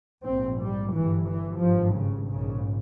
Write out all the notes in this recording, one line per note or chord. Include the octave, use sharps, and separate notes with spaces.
A#1 G#2 C4
G3
G1 G2 E3
E3
G#1 G2 F3
C#3
A#1 G#2 C#3